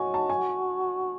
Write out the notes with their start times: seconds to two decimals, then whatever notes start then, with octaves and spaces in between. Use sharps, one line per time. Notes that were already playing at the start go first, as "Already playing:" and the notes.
Already playing: F#4 C#5 D#5 G#5
0.14 A5
0.30 G#5